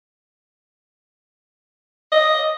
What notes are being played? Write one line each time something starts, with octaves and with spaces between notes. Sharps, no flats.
D#5